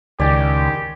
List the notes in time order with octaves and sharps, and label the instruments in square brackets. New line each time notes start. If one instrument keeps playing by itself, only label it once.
[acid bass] C#2 [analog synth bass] D#3 [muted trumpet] G4 [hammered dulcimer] D5 G#5